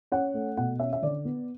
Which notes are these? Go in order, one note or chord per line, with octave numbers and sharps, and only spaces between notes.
C#4 F#5
A3
B2 F#5
C#4 E5
E5
D3 D5
B3